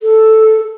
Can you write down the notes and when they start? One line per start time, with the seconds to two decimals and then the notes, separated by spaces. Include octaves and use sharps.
0.02 A4